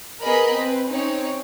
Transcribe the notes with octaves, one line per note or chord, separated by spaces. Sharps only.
B3 G#4 A#4 D#5 A#5 B5
C4 B4
C4 C#4 D#4 C#5